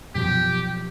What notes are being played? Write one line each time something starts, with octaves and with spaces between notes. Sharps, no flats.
F#2 B2 F3 G4